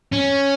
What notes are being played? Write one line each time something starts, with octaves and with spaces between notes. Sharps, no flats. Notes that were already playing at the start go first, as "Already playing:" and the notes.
C#4